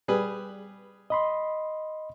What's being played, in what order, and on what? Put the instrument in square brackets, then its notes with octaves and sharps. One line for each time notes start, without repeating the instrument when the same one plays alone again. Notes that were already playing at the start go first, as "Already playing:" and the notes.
[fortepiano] G3 G#4 B4
[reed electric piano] D#5 B5 C6